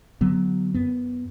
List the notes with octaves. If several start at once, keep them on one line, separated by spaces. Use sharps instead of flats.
D3 F#3 B3
F#2 B3